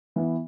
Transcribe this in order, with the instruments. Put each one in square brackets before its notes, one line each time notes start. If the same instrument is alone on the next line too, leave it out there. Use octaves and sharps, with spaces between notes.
[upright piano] E3 B3